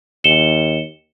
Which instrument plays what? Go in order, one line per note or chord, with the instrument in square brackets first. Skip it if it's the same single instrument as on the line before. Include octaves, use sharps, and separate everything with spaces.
[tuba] D#2 [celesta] C#7 E7 G7